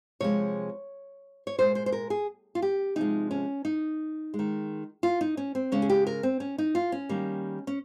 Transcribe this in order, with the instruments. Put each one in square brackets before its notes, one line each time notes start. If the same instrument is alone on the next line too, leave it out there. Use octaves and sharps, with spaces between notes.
[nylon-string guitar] C3 F3 G#3 C#5
C#5
A#2 G#3 C5
C5
C5
A#4
G#4
F4
G4
C3 F3 G#3 D#4
C#4
D#4
G#3
D#3
F4
D#4
C#4
C4
C#3 G#3 C#4
G#4
G4
A#4
C4
C#4
D#4
F4
C#4
D#3 G3 A#3
C#4